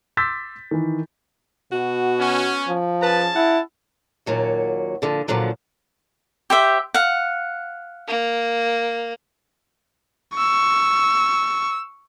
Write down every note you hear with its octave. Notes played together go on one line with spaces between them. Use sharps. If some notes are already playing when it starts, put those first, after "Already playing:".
C6 D6 E6 G6 A6 B6
D#3 E3
B2 F#4
B3 C#4
F3
C#4 G#4 B4 A5
E4 F#5
D#2 A#2 F#3 F#4
A#2 D3 F3
A#2 D3 F3 F#3
G4 C5 E5
F5 F#5
A#3
C#6 E6